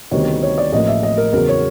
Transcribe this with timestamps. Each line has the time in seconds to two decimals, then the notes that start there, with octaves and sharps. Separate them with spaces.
0.11 D2 C3 D#3 G3 B3 C#5
0.43 C#5
0.58 D5
0.72 A1 A2 F3 A#3 D#5
0.88 E5
1.03 D#5
1.18 A#4
1.32 E2 C#3 F#3 B3 A#4
1.49 C#5